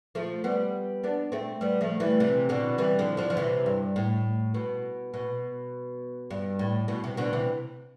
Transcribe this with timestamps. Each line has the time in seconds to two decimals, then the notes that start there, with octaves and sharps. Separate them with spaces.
0.15 F3 A3
0.44 G3 B3
1.04 B3 D4
1.32 A3 C4
1.61 G3 B3
1.81 F3 A3
2.00 E3 G3
2.20 C3 E3
2.49 B2 D3
2.78 E3 G3
2.99 D3 F3
3.17 D3 F3
3.30 F3
3.37 C3 E3
3.66 G2
3.96 A2
4.54 B2
5.14 B2
6.31 G2
6.59 A2
6.88 B2
7.04 C3
7.17 B2 D3
7.33 C3 E3